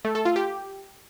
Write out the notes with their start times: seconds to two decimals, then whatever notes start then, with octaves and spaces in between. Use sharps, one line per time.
0.05 A3
0.15 A4
0.25 F4
0.36 G4